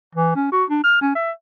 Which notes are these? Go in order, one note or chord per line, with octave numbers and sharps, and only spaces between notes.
E3
C#4
F#4
D4
F6
C#4
E5